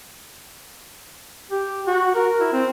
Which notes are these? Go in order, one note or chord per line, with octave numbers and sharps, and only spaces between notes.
G4
F#4
A#4
E4
C4